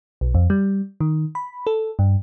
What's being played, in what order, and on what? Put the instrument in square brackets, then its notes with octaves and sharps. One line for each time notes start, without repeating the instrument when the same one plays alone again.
[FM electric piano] B1
F2
G3
D#3
B5
A4
G2